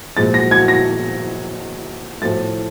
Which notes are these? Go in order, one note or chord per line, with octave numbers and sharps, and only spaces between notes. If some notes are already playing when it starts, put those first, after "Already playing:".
A#2 F3 G#3 A6
A#6
G#6
A#6
A2 F3 A3 A6